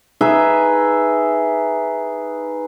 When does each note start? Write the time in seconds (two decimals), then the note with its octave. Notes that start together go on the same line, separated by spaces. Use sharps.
0.21 D#4 G#4 B4 E5